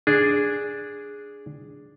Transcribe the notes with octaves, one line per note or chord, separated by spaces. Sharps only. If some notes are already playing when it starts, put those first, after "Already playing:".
D4 G#4